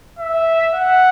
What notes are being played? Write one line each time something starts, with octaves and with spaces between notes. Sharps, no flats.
E5
F#5